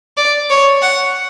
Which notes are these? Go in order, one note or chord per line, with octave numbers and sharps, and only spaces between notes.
D5
C#5
F#5